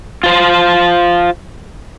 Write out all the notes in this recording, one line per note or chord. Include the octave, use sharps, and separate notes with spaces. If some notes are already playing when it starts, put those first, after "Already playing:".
F4 C5